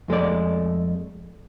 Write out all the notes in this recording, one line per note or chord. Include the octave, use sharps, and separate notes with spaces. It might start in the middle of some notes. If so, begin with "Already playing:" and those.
F2 G#3 A3 D5